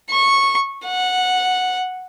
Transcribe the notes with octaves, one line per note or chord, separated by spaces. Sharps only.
C#6
F#5